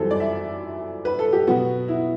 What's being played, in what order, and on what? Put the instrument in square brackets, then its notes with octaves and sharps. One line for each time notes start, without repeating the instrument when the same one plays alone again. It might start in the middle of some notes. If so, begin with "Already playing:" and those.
Already playing: [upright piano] F#2 E3 G3 C4 A4
D5
E5
B4
A4
G4
B2 F#3 B3 F#4
E4